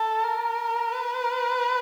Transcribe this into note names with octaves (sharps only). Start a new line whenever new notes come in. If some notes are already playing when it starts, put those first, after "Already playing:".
Already playing: A4
A#4
B4